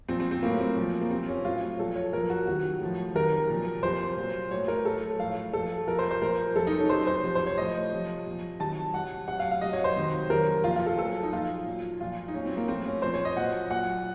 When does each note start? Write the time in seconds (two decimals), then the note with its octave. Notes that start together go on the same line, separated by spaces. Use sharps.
0.09 A#2 F3 C4
0.20 C4
0.31 C4
0.42 A2 F#3 A#3
0.60 C4
0.77 A#2 F3
1.02 A#3
1.10 C3 F3 C4
1.28 C#4
1.45 A2 F#3 F4
1.79 A#2 F3 A4
1.96 C#5
2.13 A#2 F3 A#4
2.30 F#4
2.47 C3 D#3 F#3 F#4
2.81 A2 F3
3.15 C3 D#3 F#3 A#4
3.49 A#2 F3
3.83 C3 F3 C5
4.17 A#2 F#3
4.51 A2 F#3 C#5
4.68 A#4
4.85 A2 F#3 A4
5.19 A2 F3 F5
5.53 A#2 F3 A4
5.87 C3 F3 A#4
5.99 C5
6.11 C5
6.22 A#2 F3 A#4
6.56 C3 F3 A4
6.67 D#4
6.78 C#4
6.89 C3 F#3 C5
7.07 C5
7.23 C3 F3
7.35 C5
7.46 C#5
7.58 A2 F3 D#5
7.92 C3 F3
8.26 A#2 F3
8.60 C3 D#3 F#3 A5
8.94 C3 F#3 F#5
9.28 C3 F#3 F#5
9.40 F5
9.51 F5
9.61 C3 F#3 D#5
9.73 C#5
9.84 C5
9.96 C3 D#3 F#3
10.30 C3 D#3 F#3 A#4
10.64 F3 F4
10.67 A#2
10.76 F4
10.86 A4
10.98 A#2 F#3 A4
11.23 D#4
11.32 A#2 F3 F4
11.66 A#2 F#3
12.00 A#2 F3 F4
12.28 D#4
12.34 A#2 F#3 C#4
12.45 C4
12.57 A#3
12.68 A2 F3 C4
12.86 C#4
13.02 A#2 F3 C5
13.14 C#5
13.25 D#5
13.37 A#2 F#3 F#5
13.71 A#2 F#3 F#5